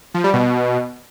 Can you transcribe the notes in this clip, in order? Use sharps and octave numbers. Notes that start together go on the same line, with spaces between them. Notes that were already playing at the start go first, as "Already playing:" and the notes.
F3
G3
B2